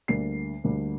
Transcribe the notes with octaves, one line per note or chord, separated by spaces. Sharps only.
D2 D3 G3 A#3 C7
D2 D3 G3 A#3